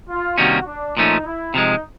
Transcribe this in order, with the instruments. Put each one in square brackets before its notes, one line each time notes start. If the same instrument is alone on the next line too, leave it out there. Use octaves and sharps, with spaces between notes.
[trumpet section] F4
[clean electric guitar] C3 D#3 G3 A#3 C#4 [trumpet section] F#4
[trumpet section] D4
[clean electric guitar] A#2 F3 A3 C#4 [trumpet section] D#4
[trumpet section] E4
[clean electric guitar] C3 F3 G#3 [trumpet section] D#4